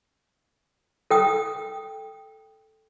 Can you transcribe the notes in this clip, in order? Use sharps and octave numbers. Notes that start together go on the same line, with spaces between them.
A4 G5 D#6